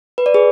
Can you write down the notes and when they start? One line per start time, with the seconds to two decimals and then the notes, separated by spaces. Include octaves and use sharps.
0.18 B4
0.26 D5
0.34 G#4 B4